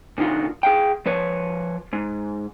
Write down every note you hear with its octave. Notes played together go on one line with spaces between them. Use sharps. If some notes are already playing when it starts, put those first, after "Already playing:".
A#2 D3 D#4 F4 F#4
G#4 F5 G5
F3 B4 C#5
G#2